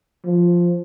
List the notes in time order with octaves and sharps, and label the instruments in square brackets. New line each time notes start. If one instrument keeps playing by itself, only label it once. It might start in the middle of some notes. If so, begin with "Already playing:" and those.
[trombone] F3